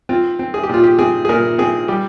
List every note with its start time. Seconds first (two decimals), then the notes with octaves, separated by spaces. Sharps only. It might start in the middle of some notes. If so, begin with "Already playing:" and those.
0.09 C4 F4
0.39 C4
0.54 G#4
0.63 G4
0.69 A#2 F4
0.84 G4
0.99 C4 G#4
1.25 G#4
1.29 A#2 A#4
1.58 C4 G#4
1.88 G3 G4